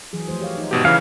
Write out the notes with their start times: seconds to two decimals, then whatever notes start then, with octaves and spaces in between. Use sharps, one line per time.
0.13 E3 F#3 G#4
0.28 F3 A3 C5
0.40 G4 C#5 F5
0.58 D#4
0.71 G#1 B2 D#4 G4
0.85 C#3 E3 C#4 F5 F6